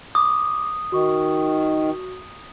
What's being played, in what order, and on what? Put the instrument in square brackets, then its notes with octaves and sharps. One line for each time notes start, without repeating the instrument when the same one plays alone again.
[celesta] D6 [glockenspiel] D#6
[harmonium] D#3 [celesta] F#4 C#6